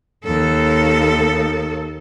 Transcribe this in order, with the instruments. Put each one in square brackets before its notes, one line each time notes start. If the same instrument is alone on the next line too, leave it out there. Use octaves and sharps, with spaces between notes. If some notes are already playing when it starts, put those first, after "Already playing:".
[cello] D#2 A4